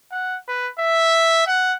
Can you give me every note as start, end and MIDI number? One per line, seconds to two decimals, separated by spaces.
0.12 0.36 78
0.48 0.68 71
0.79 1.44 76
1.47 1.74 78